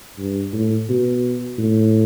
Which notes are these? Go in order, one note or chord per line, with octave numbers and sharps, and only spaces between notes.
G2
A2
B2
A2